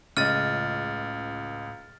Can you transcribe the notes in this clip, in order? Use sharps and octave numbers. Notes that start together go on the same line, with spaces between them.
C#2 A2 C#3 D#5 F6 A6 D#7